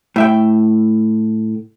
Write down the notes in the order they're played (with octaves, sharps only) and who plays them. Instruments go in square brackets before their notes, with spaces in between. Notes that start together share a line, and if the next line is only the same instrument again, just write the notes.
[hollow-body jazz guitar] A2 E5 G5